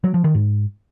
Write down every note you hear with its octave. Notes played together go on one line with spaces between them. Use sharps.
F#3
F3
D#3
G#2